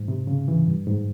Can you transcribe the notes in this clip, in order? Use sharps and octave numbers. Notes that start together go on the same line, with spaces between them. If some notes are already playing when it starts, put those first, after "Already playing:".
Already playing: G#2
C3
C#3
E3
G2
G#2